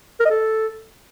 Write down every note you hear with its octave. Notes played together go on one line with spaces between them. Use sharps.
A#4
D#5
A4